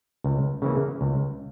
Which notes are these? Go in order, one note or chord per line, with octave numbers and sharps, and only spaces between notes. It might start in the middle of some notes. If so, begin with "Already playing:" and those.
C#2
C#3 E3 A#3
C#2